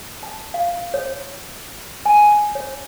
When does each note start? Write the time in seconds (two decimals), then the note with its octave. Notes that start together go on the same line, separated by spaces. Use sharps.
0.23 A5
0.54 F5
0.94 C#5
2.05 G#5
2.55 C#5